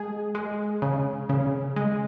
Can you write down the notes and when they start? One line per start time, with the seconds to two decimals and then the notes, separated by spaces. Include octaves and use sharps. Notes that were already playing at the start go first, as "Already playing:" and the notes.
Already playing: G#3 G#4
0.35 G#3
0.82 C#3
1.29 C#3
1.76 G#3